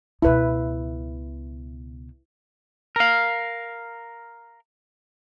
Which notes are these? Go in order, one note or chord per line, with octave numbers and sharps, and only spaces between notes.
C#2 B2 E4 B4
A#4 F5